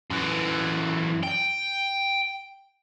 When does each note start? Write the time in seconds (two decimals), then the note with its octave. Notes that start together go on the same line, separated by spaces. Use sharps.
0.10 F#2 E3
1.24 G5